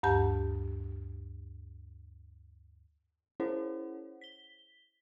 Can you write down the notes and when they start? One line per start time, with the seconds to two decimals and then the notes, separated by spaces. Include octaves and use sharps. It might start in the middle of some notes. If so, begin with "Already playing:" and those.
0.03 D2 G2 G4 A5 G6
3.40 C#4 E4 G#4 C5 C#5 F#5
4.21 B6 G7